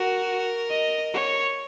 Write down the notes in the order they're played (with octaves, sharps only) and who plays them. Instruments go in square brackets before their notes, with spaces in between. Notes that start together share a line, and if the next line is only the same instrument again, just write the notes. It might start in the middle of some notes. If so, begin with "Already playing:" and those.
Already playing: [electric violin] F#4 [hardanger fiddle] A#4
[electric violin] D#5
C#5